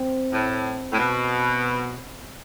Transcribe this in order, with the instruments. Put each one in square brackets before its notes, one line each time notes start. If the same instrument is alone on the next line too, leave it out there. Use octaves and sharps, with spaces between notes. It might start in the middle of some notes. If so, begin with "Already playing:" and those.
Already playing: [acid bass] C4
[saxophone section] A2
A2
B2